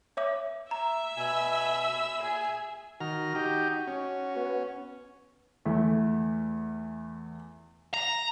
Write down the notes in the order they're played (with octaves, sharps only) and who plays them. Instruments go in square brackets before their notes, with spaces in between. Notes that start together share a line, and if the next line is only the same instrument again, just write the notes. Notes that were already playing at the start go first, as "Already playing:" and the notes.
[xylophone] C#5 E5 D6
[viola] E5 [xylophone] A#5
[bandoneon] B2 G#5 [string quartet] B5 E6
[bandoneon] A#2 [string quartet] G#4 G#5
[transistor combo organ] D#3 A#5 F6 [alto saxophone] F#4
[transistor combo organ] D#4 G4
C#4
[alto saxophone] B3
[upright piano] E2 A3
[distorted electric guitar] A#5